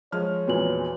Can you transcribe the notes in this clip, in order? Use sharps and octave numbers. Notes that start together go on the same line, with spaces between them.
F3 G#3 C#5 A5 F6
E2 A#2 F#4 B4 F#7